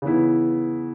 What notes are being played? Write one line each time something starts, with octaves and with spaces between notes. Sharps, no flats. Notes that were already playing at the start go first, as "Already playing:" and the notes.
C#3 E3 B3 E4